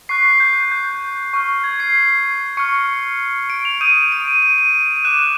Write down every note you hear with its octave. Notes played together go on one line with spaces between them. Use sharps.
C#6 F#6 C7
C7
G6
G6
C#6 F6
G#6
C7
C#6 F6 C#7
D7
F7
D#6 G6 D#7
D7
D#7
D#7
D#7
D#7
D6 F#6 E7